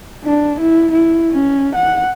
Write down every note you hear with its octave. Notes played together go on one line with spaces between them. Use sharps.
D4
E4
E4
C#4
F#5